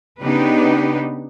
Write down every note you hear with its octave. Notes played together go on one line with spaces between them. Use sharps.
C#3 B3 D4 D#4 G4 B4